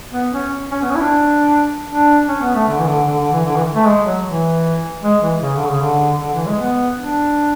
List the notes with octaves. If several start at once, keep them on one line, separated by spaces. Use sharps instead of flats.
B3
C#4
C#4
B3
C#4
E4
D4
D4
C#4
B3
A3
D3
E3
D3
D3
D3
E3
D3
E3
A3
G#3
F#3
E3
G#3
E3
C#3
D3
C#3
D3
D3
E3
G#3
B3
D4